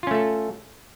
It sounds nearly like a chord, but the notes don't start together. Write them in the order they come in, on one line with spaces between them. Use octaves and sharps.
F4 C#4 A3 A4